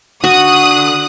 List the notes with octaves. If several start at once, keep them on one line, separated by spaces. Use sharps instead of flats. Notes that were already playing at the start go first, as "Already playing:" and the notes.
D3 F#4 D#6 F#6